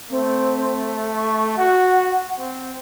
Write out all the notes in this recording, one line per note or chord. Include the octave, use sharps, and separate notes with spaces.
A3 C4
C#6
F#4 F#5
C4